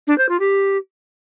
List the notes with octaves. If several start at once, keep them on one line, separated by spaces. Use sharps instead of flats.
D4
C5
F4
G4